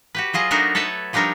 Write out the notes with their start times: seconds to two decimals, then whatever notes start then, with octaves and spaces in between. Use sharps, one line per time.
0.15 F#4 G4 B4
0.33 F#3 F4 G#4 D#5
0.51 A3 B3 D4 D#4 F#4 A#4
0.75 A4 B4 C#5 E5 A5
1.13 F3 G3 D4 D#4 A#4 C#5